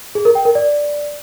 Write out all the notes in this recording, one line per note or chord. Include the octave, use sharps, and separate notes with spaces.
G#4
A#4
G5
A#4
D5